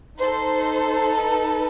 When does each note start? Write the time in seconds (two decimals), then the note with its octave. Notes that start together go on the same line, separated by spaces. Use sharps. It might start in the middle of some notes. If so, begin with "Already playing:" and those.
0.17 D#4 A4 C5
1.16 B4